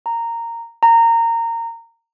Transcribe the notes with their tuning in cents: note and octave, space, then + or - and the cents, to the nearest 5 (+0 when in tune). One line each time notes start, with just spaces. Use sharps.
A#5 -10
A#5 -20